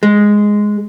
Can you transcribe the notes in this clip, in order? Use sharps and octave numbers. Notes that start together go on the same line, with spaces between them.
G#3